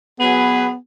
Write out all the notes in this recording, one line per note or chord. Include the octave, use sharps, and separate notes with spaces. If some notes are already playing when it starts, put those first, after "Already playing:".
F#3 B3 G#4 B4